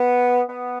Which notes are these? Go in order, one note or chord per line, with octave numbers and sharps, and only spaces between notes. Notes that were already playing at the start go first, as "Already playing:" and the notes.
Already playing: B3
B3